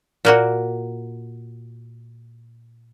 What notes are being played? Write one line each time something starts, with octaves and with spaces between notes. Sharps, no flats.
A#2 A#3 F#4